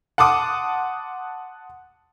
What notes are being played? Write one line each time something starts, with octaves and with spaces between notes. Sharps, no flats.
F#5 A5 C6 D6 D#6